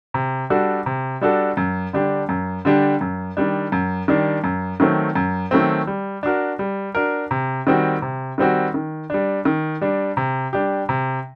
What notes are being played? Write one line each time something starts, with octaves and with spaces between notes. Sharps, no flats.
C3
G3 D4 F#4 A4
C3
G3 D4 F#4 A4
F#2
D3 G3 D4 G4
F#2
D3 G3 D4 G4
F#2
D#3 G3 D4
F#2
D#3 G3 D4
F#2
D#3 F#3 A3 C4
F#2
D#3 F#3 A3 C4
G3
D4 F#4 A#4
G3
D4 F#4 A#4
C3
D#3 G3 C4 F#4
C3
D#3 G3 C4 F#4
D#3
G3 D4
D#3
G3 D4
C3
G3 D4 G4
C3